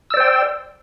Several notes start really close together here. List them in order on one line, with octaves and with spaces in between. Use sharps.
E6 D5 C5 G5